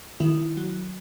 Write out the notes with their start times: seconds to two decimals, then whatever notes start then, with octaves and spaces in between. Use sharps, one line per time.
0.20 D#3 E4
0.57 F#3